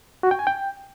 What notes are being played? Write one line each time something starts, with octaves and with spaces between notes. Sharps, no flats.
F#4
G5
G#5
G5